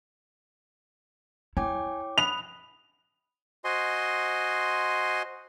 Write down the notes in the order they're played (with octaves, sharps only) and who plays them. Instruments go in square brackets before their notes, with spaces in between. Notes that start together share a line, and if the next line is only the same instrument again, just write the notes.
[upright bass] E4 [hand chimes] C#5 G5 D6 [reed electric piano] G#5
[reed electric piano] B5 D#6 F#6 [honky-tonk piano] F7
[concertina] F#4 C5 D#5 G#5 C6